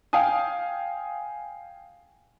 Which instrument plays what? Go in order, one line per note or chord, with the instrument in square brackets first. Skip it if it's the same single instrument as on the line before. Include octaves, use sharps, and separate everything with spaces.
[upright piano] F5 G5 G#5 D#6